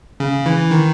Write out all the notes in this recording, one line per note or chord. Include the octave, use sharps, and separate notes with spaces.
C#3
E3
D#3